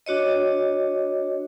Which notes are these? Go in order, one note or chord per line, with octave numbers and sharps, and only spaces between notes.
D4 F#4 C#5 D#5